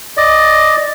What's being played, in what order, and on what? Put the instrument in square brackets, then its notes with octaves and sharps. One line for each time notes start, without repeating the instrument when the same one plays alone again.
[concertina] D5 D#5